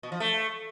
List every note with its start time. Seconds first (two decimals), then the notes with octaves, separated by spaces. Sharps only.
0.03 B2
0.12 F3
0.20 A3